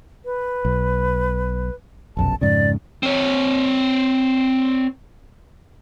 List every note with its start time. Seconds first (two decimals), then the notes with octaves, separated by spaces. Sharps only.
0.25 B4
0.65 B1
2.17 F1 B1 F#2 A5
2.41 F2 G#2 C#3 D5
3.03 C4 C#5